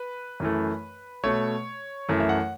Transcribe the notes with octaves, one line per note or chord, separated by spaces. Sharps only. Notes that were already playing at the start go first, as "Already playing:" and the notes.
Already playing: B4
F#2 E3 A3
B2 A3 C#5
F#2 E3 A3
E5
F#5